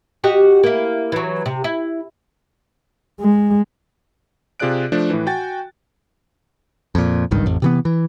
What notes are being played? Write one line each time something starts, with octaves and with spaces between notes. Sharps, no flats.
F#4 G4 D#5
A#3 E4
E3 F#3
C3
E4
G#3
C3 F4 G#4 D5 F#6 D7
F3 A3 D4
A2 E3
F#4 G5 G#5 A6
F2 A#2
G#1 C#2 G2 D#3
A1 F2
C3 E3 B3
E3